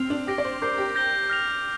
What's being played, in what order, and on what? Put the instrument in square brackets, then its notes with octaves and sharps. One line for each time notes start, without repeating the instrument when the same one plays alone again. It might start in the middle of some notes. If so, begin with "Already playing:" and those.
Already playing: [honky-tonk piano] C4 [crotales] F6 C7 F7
[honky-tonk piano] D4
[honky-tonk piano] G4 [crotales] D6 A#6 D7 G7
[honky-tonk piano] D5
C5
[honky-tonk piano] A#4 [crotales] D6 G6 C7 G7
[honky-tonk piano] G4
[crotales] G6 A#6 G7
F6 A#6 F7